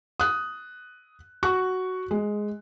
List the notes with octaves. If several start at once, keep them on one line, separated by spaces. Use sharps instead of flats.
D#6 F#6
F#4 C#6 F#6
G#3